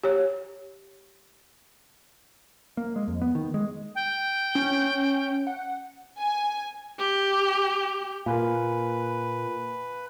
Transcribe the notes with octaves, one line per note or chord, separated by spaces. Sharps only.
G4 C#5
A#3
G#3
F2
B3
D#3
G#3
G5
C#4
F#5
G#5
G4
A#2 F4 A#4 B4 F5 G#5